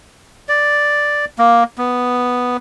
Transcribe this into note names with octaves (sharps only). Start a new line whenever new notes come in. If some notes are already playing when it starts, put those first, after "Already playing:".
D5
A#3
B3